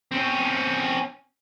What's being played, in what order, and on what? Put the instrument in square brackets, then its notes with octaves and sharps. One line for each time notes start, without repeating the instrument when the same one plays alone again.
[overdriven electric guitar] C4 C#4